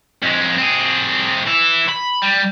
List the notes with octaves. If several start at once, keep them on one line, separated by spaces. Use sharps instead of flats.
F2 G#3
C4 G#4
E3 E4
B5
G3